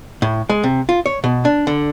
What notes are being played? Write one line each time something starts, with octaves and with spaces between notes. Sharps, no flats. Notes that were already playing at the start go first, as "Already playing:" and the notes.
A2
G#3
C3
F4
C#5
B2
D4
D3